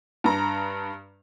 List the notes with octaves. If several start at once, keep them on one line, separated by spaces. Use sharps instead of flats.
G2 A#5